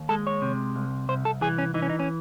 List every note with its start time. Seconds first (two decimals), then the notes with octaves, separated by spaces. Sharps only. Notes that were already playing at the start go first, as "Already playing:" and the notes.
Already playing: D#2
0.09 G#3 A4
0.27 C#5
0.42 C3
0.76 C2
1.09 C2 C5
1.25 A4
1.41 E3 G#4
1.58 C#4
1.74 E3 D#4
1.82 C#4
1.90 D#4
2.00 C#4